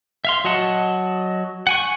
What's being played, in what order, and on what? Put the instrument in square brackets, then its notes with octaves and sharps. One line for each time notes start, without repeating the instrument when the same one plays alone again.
[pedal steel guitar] E5 F5 C6
F#3 F#4 D#5 F#5 A5
F#5 G#5 C#6